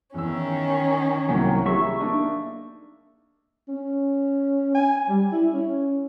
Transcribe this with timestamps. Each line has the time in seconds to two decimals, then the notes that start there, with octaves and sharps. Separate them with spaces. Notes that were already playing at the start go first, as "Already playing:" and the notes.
0.14 E2 D#3 C#4 E6
1.29 C2 F#3 A#3 G5
1.66 G3 E4 G#4 E5 C#6 E6
2.00 A#3 D4 D#4
3.68 C#4
4.75 G#5
5.09 G3
5.32 E4
5.54 C#4